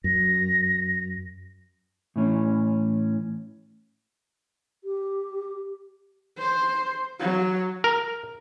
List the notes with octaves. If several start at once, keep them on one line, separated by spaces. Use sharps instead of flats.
F#2 A#6
A2 E3 C#4
G4
C5
F#3
A#4